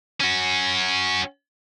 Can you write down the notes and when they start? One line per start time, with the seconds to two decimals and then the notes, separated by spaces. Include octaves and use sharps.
0.20 C#4 F#4